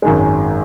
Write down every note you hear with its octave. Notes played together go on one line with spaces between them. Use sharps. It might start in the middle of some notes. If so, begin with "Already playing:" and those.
G#1 F#2 D#3 G#3